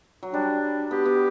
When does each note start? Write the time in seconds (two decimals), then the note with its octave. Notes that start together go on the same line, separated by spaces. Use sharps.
0.23 F#3
0.33 G3 D4
0.91 B3 G4
1.05 B3